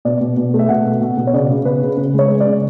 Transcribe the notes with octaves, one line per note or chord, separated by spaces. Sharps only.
B2 D5
B2
B2
A3
E5
B2 F#5
B2
B2
B2
C#5
C#3 D5
C#3
B3 B4
C#3
C#3 B4
G#3
C#5
G#3
D5
C#3